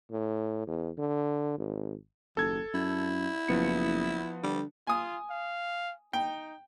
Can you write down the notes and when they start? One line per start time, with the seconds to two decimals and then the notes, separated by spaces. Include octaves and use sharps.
0.11 A2
0.67 E2
0.98 D3
1.58 G#1
2.37 F#1 D#2 A4 G#6
2.74 F#2 E4
3.48 F#1 F3 B3 C#7
4.43 D3 G3
4.87 F4 G#5 D#6
5.30 F5
6.13 D#4 G5